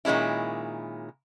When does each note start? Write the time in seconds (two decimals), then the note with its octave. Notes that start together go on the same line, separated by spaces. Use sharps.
0.05 A#2 D#3 G#3 C#4 E4